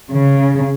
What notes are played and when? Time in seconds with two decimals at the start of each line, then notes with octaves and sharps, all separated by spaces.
0.11 C#3